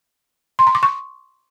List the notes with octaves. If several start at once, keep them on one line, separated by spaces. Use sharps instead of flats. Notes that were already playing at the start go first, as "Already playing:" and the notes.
C6
A#5
D6
C#6